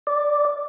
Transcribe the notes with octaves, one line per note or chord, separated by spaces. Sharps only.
D5